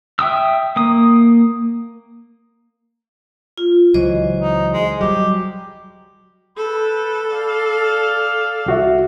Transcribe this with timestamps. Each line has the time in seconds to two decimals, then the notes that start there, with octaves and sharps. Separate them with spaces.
0.19 E5 G5 D#6 E6
0.76 A#3 D#6
3.58 F4
3.94 C#2 E3 F#3 C5 D#5
4.40 D#4
4.73 G#3
5.01 F#3 G3 G4
6.57 A4 B4 G5 B5
7.32 D5 F5
8.66 C2 F#4 E5